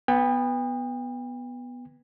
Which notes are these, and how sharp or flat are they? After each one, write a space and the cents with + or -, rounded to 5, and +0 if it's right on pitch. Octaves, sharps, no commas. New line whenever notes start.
B3 +0 G5 +40